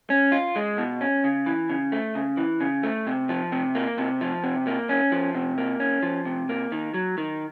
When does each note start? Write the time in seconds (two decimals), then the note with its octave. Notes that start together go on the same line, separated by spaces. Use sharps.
0.10 C#4
0.32 F4
0.56 G#3
0.78 B2
1.01 C#4
1.24 C#3
1.46 E3
1.69 C#3
1.92 A3
2.15 C#3
2.37 E3
2.60 C#3
2.83 A3
3.07 C3
3.29 F3
3.52 C3
3.75 A#3
3.98 C3
4.21 F3
4.44 C3
4.67 A#3
4.89 C#4
5.12 F3
5.35 C3
5.58 A#3
5.80 C#4
6.03 F3
6.25 C3
6.49 A#3
6.72 D#3
6.94 F#3
7.18 D#3